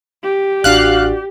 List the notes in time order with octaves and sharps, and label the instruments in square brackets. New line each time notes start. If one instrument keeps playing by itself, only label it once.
[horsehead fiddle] G4
[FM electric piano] A1 D4 A6 [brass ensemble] F#4 D5 [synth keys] F5 F#6